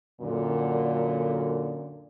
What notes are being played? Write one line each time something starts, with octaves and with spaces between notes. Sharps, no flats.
F#2 A#2 D3